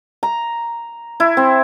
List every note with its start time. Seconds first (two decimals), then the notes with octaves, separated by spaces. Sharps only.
0.23 A#5
1.20 E4
1.37 C4